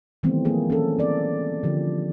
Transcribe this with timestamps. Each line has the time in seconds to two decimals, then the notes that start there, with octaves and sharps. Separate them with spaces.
0.23 D#3 E3 G3 A3 B3 C4
0.45 F3 A#3 G#4
0.70 C#4 A4
0.99 C4 D5
1.63 D3 F3 G4